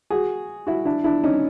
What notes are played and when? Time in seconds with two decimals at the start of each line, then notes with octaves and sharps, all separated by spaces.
0.10 F#4 G#4
0.67 E4 F#4
0.85 D4 E4
1.04 D4 E4
1.24 C#4 D#4